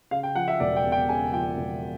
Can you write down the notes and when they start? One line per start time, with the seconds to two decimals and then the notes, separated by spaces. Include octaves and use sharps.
0.11 C#3 F5
0.23 G5
0.35 F3 F#5
0.48 E5
0.60 E1 D5
0.76 G5
0.84 E2
0.92 G5
1.09 C#3 G#5
1.33 F3 G5
1.57 E1